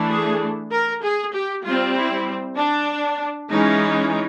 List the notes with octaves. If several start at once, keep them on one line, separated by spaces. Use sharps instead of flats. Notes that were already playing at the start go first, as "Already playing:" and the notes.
Already playing: E3 A3 D4
G#4
A#4
G#4
G4
G3 C4 F4
E4
D4
E3 G#3 C#4 D#4